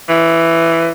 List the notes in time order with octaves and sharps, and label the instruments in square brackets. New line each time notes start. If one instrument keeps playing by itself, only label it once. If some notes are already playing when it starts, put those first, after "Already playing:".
[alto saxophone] E3